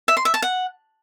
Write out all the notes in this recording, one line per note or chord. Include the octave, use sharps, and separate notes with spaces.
E5
C6
E5
A5
F#5